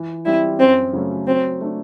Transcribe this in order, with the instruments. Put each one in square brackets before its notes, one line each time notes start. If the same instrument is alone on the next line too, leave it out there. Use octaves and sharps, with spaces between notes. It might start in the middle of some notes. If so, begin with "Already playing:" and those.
Already playing: [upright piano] E3
[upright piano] G3 C4 [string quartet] E4
[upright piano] F#2 [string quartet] C4
[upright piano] C#3 F#3 A3
[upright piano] F#3 [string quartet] C4
[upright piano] A3 D4